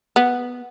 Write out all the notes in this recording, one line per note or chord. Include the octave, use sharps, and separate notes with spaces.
B3